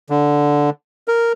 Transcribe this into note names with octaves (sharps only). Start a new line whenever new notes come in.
D3
A#4